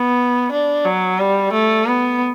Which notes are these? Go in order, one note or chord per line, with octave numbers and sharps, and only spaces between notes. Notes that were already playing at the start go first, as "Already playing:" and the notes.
Already playing: B3
D4
F#3
G3
A3
B3